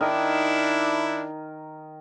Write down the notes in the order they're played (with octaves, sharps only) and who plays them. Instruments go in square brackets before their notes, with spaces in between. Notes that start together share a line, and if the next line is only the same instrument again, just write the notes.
[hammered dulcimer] D#3 A#4 D#5 [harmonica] D4 E4